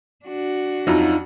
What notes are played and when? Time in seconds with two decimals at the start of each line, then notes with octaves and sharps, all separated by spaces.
0.25 D4 F#4
0.87 F2 F#3 D#4 F4